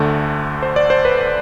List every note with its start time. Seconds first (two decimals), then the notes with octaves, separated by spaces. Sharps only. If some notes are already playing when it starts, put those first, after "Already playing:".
Already playing: D2 D3 A3
0.62 C5
0.76 D5
0.90 C5
1.05 B4